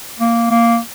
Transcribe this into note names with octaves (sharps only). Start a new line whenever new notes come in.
A#3
A#3